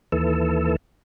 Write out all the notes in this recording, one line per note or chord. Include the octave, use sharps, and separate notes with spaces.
D#2 E3 A4